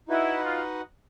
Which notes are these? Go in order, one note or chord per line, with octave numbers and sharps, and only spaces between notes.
D#4 E4 F#4 B4 D#5 F#5
F4